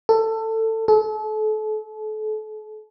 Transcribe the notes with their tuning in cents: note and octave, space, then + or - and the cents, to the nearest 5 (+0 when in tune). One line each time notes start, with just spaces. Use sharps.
A4 +20
A4 -35